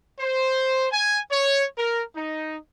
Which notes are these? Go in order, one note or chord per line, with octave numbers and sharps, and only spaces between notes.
C5
G#5
C#5
A#4
D#4